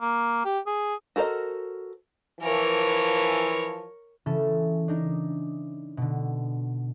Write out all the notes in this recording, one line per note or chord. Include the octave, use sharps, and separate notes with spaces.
A#3
G4
G#4
F#4 A4 A#4 C5 D#5
E3 F3 A#4 C#5
C#3 E3 C#4 A4
D4 D#4 A#4
B2 D3